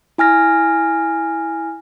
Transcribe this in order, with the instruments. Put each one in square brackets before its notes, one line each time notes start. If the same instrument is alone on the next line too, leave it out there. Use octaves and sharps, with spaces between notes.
[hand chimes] E4 G#5 F6 A#6